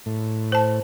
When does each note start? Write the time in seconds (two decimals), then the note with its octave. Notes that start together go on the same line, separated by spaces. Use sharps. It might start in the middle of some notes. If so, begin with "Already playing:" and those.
0.06 A2
0.52 C5 A5